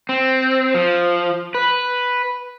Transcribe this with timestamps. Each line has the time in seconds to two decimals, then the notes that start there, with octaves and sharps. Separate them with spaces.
0.09 C4
0.75 F3
1.55 B4